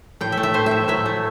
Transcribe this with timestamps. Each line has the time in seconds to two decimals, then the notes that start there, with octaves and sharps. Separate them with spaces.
0.21 A2 G5
0.32 E5
0.37 A3
0.43 E5
0.54 A2 C5
0.66 A2 E5
0.88 F#3 E5
1.06 A3